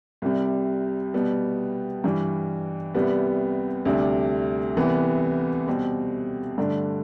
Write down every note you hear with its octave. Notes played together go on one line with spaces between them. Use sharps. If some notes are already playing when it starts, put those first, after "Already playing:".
C2 C3 G3
B2 G3 B3
G2 E3 G3
C2 C3 G3 B3
D2 C3 G3 D4
C2 C3 E3 B3
B2 G3 C4 G4
G2 D3 A3 D4